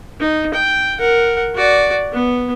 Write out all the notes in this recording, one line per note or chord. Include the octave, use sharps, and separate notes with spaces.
D#4
G5
A#4 F#5
F#4 D5
B3